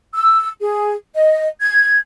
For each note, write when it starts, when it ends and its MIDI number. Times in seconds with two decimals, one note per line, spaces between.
0.14 0.48 88
0.61 0.93 68
1.15 1.47 75
1.61 1.97 92